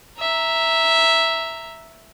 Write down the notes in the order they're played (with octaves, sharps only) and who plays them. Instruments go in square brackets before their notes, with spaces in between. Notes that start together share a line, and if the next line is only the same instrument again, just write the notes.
[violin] E5 A#5